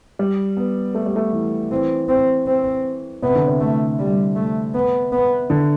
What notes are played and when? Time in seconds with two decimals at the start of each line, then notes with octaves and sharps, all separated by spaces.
0.19 G3
0.57 B3
0.95 A3
1.06 G3
1.16 A3
1.33 E3
1.71 E3 C4
2.09 C4
2.47 C4
3.22 C3 B3
3.35 D3
3.48 C3
3.60 A3
3.99 G3
4.36 A3
4.74 B3
5.12 B3
5.50 D3